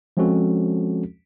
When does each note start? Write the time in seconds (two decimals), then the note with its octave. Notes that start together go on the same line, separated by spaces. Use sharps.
0.17 F3 G#3 C4 C#4 F#4 A4